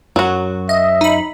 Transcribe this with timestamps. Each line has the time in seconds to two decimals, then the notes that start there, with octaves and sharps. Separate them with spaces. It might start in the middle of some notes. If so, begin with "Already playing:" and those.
0.16 F#2 F#3 F#4
0.69 D#5 E5
1.01 D#4 B5